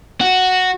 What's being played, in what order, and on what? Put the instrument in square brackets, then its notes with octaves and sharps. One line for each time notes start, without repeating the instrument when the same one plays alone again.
[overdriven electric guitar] F#4